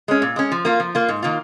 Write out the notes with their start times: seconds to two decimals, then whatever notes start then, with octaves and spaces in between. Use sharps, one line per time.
0.08 G#3 C#4
0.22 A#2
0.36 G#3 C#4
0.52 F3
0.65 A#3 F4
0.80 F3
0.95 A#3 F4
1.09 G#2
1.23 D#3 A#3 F4